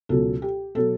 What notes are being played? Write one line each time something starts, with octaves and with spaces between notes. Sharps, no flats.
C#2 B2 F#3 A4
G4
B2 F#3 A4